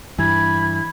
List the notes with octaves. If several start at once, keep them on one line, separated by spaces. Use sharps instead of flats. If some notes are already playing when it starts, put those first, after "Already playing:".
G2 E3 B5 G#6